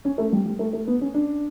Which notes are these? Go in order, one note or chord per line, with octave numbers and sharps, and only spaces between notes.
C#4
A3
G3
G3
A3
A3
B3
C#4
D4